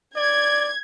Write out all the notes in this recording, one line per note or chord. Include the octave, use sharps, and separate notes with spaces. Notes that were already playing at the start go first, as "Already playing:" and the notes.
D5 G#6